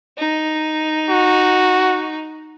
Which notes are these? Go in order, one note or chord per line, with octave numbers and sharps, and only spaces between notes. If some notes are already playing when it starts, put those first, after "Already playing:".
D#4
F#4